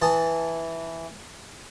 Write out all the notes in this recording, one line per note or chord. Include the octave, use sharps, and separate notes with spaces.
E3 A5 D#6